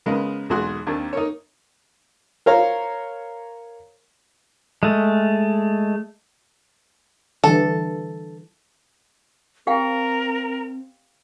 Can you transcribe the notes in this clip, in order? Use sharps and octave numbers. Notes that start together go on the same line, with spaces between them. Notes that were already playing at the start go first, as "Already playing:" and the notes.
C#3 G#3 B3 A#4 D#5
B1 E2 G#3 F#4 G#4 C6
D#2 D#3 A#3 C4 D4
D#4 A#4 C#5
A#4 C5 C#5 F5 A#5
G#3 A3
D3 E3 G3 A4
C4 G4 A#4 F5 G5